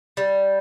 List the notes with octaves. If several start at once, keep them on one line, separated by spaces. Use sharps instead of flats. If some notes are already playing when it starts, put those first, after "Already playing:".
G3